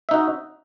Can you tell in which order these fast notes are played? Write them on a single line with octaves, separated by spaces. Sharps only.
E5 D#4 F#4